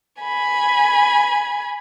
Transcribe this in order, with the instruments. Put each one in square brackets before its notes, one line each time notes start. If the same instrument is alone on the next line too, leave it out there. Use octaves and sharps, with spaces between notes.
[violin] G#5 B5